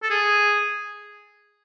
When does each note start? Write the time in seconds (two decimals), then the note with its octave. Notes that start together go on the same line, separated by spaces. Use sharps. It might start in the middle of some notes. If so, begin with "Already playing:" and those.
0.03 A4
0.10 G#4